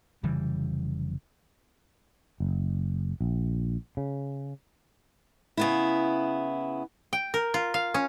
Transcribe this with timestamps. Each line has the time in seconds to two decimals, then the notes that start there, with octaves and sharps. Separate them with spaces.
0.23 F1 C#3 E3 G3
2.40 F#1
3.21 A#1
3.97 C#3
5.57 C#3 B3 E4
7.13 G5
7.34 A#4
7.54 F4
7.74 F5
7.94 C#4